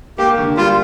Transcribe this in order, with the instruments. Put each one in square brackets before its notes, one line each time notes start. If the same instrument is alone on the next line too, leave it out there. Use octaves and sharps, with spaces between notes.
[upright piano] A#3 [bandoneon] G4
[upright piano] D3
[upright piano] G3 [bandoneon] F4